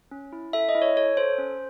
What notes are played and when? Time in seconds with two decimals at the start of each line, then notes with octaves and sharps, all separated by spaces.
0.11 C#4
0.32 E4
0.53 A4 E5
0.69 D#5
0.75 E4
0.82 C#5
0.97 A4 C#5
1.17 A4 C5
1.38 C#4